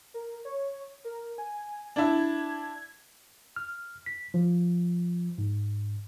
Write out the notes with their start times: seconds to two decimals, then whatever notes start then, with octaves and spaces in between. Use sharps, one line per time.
0.14 A#4
0.45 C#5
1.04 A#4
1.38 G#5
1.96 D4 E4 G#6
3.56 F6
4.06 B6
4.34 F3
5.38 G#2